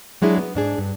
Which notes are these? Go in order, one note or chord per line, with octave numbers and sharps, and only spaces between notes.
F#3 G#3 D4 E4 G#4
B3
G#2 D4 G#4
G2